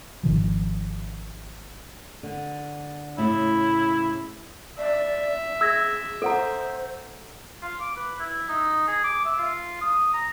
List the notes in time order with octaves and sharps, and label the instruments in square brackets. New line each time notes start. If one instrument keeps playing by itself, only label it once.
[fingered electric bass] G#1 C3 D#3 F3
[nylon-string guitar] D3
[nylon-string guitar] A2 C#3 [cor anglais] E4
[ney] D5 [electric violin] E5
[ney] G#4 [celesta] E6 G#6 A#6
[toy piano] A4 F#5 A#5 [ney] C5
[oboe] F4
D6
B4
E4
D#4
G#4
D6
E5
F4
D#6
A#5